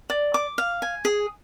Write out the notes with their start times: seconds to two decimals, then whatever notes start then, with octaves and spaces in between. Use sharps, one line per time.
0.10 D5
0.34 D6
0.58 F5
0.82 G#5
1.05 G#4